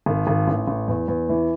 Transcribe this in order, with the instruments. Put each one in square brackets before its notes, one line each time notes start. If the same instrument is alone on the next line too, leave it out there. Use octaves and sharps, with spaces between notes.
[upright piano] G#1
G#1
A1
A1
E2
E2
E3